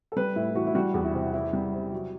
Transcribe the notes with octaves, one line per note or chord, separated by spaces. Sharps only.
A4
G3 B4
A2 E4
E4
E3 F#4
E4
G3 F#4
E2
E4
C3
E3 E4
G3
C3
F#3